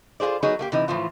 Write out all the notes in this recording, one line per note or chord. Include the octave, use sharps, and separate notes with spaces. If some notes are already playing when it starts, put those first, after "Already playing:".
F4 F#4 G#4 C5 D5
F#3 B3 D#4 G#4 C#5
A3 A#3 G4
C3 E3 D#4
A2 E3 F3 F4